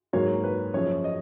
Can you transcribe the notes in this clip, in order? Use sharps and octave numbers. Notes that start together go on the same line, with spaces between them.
G#2 F#3 A#3 C#5
B4
F#2 C#3 F3 C#5
D#5